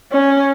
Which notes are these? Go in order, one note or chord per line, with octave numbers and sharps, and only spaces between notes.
C#4